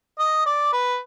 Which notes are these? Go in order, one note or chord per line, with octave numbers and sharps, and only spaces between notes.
D#5
D5
B4